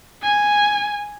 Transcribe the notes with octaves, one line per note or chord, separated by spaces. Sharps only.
G#5